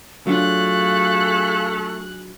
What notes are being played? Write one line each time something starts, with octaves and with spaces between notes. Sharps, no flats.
F#3 A3 D4 F4 G#4 F5 F#6